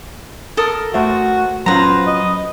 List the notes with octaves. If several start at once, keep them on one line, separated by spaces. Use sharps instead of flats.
A4 A#4 D#6
A3 F#4 C5 E5
F#3 C#4 F4 B4 C5 A#5
D#5